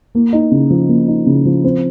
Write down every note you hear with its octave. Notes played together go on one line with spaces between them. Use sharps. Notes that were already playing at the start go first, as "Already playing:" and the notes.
A#3
D#4
C#3
F3
A#3
D#4
C#3
F3
C4